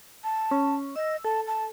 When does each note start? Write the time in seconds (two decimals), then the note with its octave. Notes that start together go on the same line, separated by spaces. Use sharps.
0.24 A5
0.51 C#4
0.96 D#5 E6
1.25 A4 A5
1.47 A5